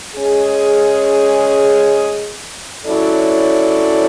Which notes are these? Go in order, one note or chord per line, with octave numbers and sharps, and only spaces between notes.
G#3 C#4 G#4
F#3 C#4 E4 A4 D5